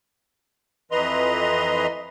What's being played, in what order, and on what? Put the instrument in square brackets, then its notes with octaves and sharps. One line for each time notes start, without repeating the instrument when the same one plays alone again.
[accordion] F2 E3 B4 D#5 A#5 C6